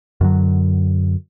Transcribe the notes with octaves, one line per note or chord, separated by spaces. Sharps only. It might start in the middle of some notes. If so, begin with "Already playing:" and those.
F#2 D3 F#3